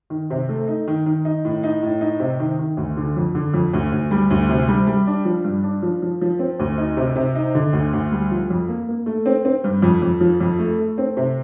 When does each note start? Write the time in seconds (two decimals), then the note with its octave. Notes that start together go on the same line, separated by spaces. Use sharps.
0.10 D#3
0.30 C3
0.49 A3
0.67 D#4
0.88 D#3
1.06 D#3
1.25 D#4
1.45 A2
1.63 D#4
1.83 A2
2.01 D#4
2.20 C3
2.40 D#3
2.59 D#3
2.77 D2
2.97 D3
3.16 F2
3.35 D3
3.54 F2
3.73 D2
3.92 D2
4.11 G3
4.30 D2
4.49 C3
4.68 G3
4.87 G3
5.07 D4
5.25 F3
5.44 G2
5.64 D4
5.82 F3
6.02 F3
6.21 F3
6.39 C4
6.59 D2
6.78 D#4
6.97 C3
7.16 C3
7.35 D#4
7.55 D3
7.73 D2
7.93 D2
8.12 G3
8.31 F3
8.50 F2
8.68 A#3
8.88 A#3
9.06 A3
9.26 C4
9.45 C4
9.64 G2
9.82 F2
10.02 F2
10.21 F3
10.40 F2
10.59 A3
10.79 A3
10.98 C4
11.17 C3